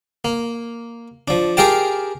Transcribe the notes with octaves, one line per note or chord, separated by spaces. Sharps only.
A#3
F3 D4
G4 G#4 A#4 F5 G5 A5